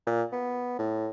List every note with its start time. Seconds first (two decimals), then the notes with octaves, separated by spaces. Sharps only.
0.06 A#2
0.32 B3
0.79 A2